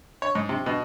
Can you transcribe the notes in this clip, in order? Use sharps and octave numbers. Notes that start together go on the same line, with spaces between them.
C#5
G#2
C3
B2